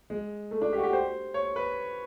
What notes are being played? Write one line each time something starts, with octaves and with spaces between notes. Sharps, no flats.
G#3
A3
D4
G4
F#4
G4
C5
C#5
B4